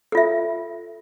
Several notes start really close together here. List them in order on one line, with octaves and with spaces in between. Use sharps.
A4 F4 E5